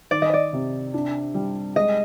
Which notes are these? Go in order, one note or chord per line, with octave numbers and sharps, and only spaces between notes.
D#3 D5
D#5
D5
C3
D4
G3
G#3 D#5